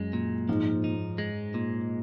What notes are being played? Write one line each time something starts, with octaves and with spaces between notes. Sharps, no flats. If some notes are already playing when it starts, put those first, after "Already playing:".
Already playing: F#2 G#3
A#2
G#2 F3
D#4
G#3
A#2